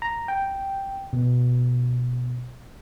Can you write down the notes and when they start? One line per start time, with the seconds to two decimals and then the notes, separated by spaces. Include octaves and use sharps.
0.02 A#5
0.28 G5
1.13 B2